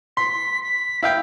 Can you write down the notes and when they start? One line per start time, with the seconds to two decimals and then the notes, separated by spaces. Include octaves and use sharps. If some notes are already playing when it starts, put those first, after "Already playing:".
0.17 C6 B6
0.63 B6
1.03 E4 F5 G5